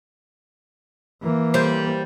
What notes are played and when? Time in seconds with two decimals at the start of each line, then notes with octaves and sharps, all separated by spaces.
1.22 E3 A#3
1.54 G3 C5